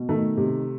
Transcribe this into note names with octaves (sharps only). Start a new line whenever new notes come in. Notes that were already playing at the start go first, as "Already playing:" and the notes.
Already playing: B2
D#3 A3
C3